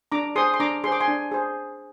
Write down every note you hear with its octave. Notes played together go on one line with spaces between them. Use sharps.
D4 A#5 D6
G#4 C5 C6 D#6
C6
D4 A#5 D6
G#4 C5 C6 D6
G#5 C6
D4
G#4 C5